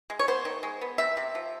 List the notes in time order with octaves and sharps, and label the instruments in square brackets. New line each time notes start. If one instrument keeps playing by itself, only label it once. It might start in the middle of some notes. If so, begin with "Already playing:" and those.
[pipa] G#3
C#5
B3 C5
D#3
G#3
B3
C3 E5
C3
F3